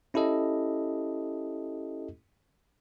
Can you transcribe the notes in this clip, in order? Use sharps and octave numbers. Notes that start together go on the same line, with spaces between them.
C#4 E4 G4 A4 D#5